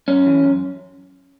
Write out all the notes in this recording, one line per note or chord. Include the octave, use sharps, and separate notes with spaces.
F#2 C#4
E3
F#2